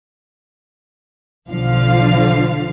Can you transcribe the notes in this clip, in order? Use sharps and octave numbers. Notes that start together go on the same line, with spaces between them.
B1 D3 F3 F5